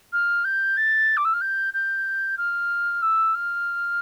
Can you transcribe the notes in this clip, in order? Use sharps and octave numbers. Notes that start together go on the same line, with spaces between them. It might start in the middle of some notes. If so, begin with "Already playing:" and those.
F6
G6
A6
D6
E6
F6
G6
G6
F6
E6
F6